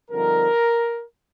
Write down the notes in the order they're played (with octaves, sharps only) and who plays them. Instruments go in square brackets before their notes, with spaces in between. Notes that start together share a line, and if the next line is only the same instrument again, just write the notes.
[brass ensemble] G2 D3 F3 C4 D#4 A#4